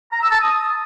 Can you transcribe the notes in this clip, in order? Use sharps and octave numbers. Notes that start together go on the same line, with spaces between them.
A#5
E6
A5
D#6